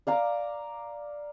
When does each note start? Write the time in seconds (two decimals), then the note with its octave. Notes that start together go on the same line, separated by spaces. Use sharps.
0.07 D5 F5 A#5 D6